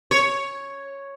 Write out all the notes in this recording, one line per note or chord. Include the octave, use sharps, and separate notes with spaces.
C#5